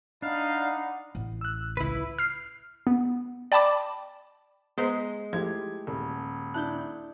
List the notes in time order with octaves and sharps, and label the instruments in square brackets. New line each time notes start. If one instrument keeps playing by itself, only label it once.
[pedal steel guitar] D4 [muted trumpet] D#4 [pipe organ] F5 [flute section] F#5 A5 B5
[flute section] D5 F#5 B5
[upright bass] A1
[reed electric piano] E6 F#6
[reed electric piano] C#2 [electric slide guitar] E4 B4
[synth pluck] F6 C7
B3
D5 G5 A5 B5 D6
[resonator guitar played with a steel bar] G#3 [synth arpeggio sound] B3 C5 A#5 [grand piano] B6
[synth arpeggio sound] F3 [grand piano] A3 E4 G4 [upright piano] G#6
[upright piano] D#1
[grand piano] D4 E4 A5 [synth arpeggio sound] F#6 G6